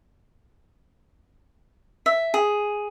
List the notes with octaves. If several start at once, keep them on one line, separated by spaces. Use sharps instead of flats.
E5
G#4